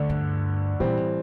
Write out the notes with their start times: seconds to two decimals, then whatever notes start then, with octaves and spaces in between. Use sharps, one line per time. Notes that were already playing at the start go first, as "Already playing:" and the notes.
Already playing: D2 D3 A3 D4
0.09 G2
0.80 A#2 E3 G3 C4
0.97 A2